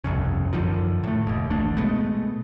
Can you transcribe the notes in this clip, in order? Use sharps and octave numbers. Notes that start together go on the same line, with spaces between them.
G1 C2 F2 C#3
F#2 D3 D#3 F3
A2 A3
F1 D#2
A1 D2 A3 D4
B2 G#3 A3 B3